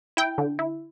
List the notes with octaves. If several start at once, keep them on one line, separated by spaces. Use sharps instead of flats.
E4 G5
D3
E4